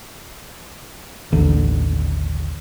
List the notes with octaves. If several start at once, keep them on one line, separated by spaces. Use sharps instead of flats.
A1 D#2 D3